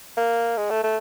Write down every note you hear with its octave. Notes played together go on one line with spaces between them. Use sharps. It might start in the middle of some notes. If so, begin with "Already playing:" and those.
A#3
G#3
A3
A3